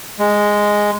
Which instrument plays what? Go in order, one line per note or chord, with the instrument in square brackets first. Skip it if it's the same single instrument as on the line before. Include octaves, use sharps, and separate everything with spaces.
[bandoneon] G#3